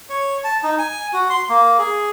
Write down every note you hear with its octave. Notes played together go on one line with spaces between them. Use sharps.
C#5
A5
D#4
G#5
F#4
C6
A#3
G#4